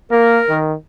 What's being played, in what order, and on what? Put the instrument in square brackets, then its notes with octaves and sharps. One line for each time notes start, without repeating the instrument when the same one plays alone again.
[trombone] A#3 [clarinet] A#4
[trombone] D#3